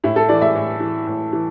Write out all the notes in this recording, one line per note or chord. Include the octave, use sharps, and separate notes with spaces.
A2 E4
A4
E3 D5
E5
A2
E3
A2
E3